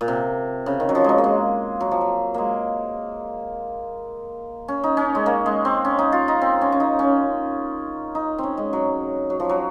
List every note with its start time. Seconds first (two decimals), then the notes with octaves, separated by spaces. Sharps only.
0.01 A#2
0.08 C3
0.66 C#3
0.80 D#3
0.89 F#3
0.95 F3
1.04 F#3 G#3
1.18 A#3
1.24 G#3
1.81 F#3
1.91 F3
2.01 F#3
2.34 G#3 A#3
4.68 C#4
4.84 D#4
4.97 C#4
5.15 G#3
5.26 A#3
5.46 G#3
5.65 C4
5.85 C#4
5.99 D#4
6.12 F4
6.28 D#4
6.42 C4
6.61 C#4
6.72 C#4
6.80 D#4
6.99 C#4
8.15 D#4
8.38 C4 C#4
8.57 G#3
8.73 F#3
9.30 F#3
9.40 F3
9.49 F#3